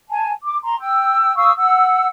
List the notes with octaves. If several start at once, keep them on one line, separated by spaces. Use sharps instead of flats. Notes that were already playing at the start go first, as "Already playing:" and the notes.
G#5 A5
D6
A#5 C6
G5 E6
F5 C#6 D#6 E6
F#5 E6